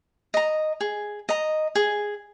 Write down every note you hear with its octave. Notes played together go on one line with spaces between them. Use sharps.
D#5 A#5
G#4
D#5 A#5
G#4